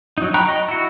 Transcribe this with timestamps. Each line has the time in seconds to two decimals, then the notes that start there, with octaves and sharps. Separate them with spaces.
0.18 F#3 D#4
0.34 G5 A#5 B5 C#6 F#6
0.48 D#5
0.68 E4 F#4